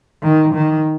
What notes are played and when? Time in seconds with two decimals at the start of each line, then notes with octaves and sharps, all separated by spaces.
0.23 D#3
0.54 D#3